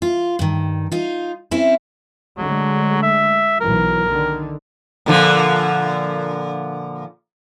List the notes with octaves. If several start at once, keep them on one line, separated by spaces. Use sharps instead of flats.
F4
G2 D#3
D#4 F4
C4 C#4 E4
D3 F#3 G#3 A3
E5
B1 E3 F#3 A#4
D3 D#3
A#2 D3 F3